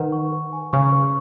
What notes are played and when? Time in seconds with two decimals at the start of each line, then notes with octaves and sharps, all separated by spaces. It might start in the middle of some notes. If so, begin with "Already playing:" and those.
Already playing: D#3 B4 F#5
0.12 C#6
0.32 B4
0.53 G#5
0.73 C#3 C#6
0.92 B4